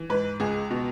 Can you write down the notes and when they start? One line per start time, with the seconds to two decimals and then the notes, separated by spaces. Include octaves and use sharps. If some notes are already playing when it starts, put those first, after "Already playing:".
Already playing: E3
0.10 G#2 B4
0.40 C#2 G#4
0.71 B2